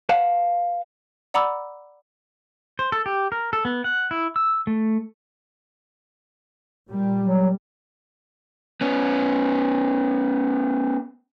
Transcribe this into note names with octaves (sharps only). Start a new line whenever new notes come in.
B4 C#5 F5 F#5 A5
D5 F#5 A#5 B5 D6 E6
C5
A4
G4
A#4
A4
B3
F#5
E4
E6
A3
A#2 G3
F#3
B3 C#4